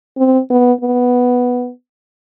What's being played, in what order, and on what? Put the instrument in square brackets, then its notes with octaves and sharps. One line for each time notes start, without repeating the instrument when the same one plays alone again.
[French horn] C4
B3
B3